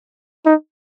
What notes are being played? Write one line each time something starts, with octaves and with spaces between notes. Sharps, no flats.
D#4